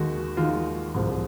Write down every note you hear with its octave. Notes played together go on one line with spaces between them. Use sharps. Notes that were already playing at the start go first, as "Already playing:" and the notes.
Already playing: D#2 D#3 G#3 F#4
D#2 D#3 G#3 F4
C2 C3 F3 G#3